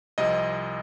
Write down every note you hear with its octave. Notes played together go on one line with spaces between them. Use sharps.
C2 C3 F3 D#5